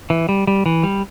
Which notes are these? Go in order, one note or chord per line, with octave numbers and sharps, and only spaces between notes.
E3
G3
G3
E3
G3